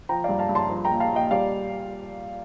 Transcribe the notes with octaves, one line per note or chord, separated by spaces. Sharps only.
F3 G5 A#5
G2 D5 F5
F5 A5
G2
A5 C6
F3
G5 A#5
A#2
F5 A5
A#2 D#5 G5
G3 D5 F5